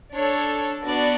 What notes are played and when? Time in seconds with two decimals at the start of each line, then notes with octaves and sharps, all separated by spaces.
0.13 D4 A4 C#5
0.84 B3 D4 F#4 A4 D5